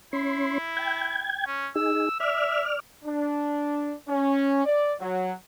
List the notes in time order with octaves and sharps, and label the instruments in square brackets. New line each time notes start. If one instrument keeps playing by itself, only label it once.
[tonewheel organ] C#4 C6 [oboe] E4
[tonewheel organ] G5 G#6
[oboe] C#4
[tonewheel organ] D#4 G#4 [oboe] E6
[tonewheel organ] D5 F6 [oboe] E5
[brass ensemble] D4
C#4
D5
F#3